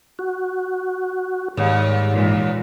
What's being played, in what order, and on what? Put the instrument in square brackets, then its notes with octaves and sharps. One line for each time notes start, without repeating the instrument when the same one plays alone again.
[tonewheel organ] F#4
[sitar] D#2 [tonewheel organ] G#2 [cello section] G3
[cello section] A#2 E3 G#3